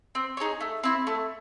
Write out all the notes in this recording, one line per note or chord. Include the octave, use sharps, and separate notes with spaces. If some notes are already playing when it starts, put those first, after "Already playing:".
C4
D#4 G#4 C#5
A3
C4 E4
A3